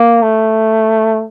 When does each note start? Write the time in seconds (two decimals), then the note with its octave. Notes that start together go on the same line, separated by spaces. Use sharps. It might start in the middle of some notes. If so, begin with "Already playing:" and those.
Already playing: A#3
0.22 A3